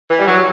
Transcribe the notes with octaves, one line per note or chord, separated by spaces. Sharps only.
E3
G3
F#3